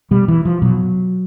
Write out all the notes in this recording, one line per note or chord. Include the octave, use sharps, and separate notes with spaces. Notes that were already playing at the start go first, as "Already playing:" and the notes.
B2 G3
E3
F3
B2 F#3